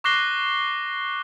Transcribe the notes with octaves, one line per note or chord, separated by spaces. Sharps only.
C#6 D6 F#6 A#6 C7 G7